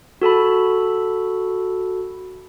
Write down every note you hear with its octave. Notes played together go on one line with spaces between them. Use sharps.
F#4 A4 A5 B5